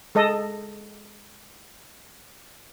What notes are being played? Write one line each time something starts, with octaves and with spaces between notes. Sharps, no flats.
G#3 A4 D#5